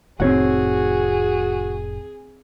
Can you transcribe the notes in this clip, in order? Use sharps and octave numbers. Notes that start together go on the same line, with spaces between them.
F1 A2 D#3 C4 F#4 G#4 C#5 F#5